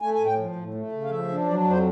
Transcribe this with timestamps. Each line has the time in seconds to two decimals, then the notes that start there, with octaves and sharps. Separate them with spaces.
0.01 A3 G#5
0.14 G#5
0.20 A2
0.26 G5
0.38 F3
0.56 A2
0.74 A3
0.92 C#3
1.04 F5
1.10 F3 E5
1.29 D4
1.46 F#3 D5
1.64 F2
1.70 C5